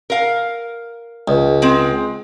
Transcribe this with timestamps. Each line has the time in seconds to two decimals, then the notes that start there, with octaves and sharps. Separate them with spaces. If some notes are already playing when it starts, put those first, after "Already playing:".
0.10 A#4 F5
1.28 C#2
1.62 G#3 C4